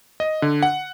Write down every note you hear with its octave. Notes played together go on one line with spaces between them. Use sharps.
D#5
D3
F#5